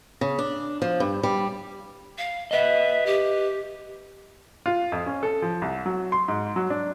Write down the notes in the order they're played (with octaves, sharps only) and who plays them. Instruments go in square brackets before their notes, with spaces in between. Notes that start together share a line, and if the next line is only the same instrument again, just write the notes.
[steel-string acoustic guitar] C#3
D4
F3
G2
G3
[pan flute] F5
[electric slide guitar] B4 D#5 [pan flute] E5
[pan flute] G4
[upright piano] F4
F2
C#4
A4
F3
C2
F#3
C6
G#2
F#3
D4